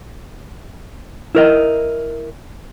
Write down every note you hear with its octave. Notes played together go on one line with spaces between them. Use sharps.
E4 A#4 D#5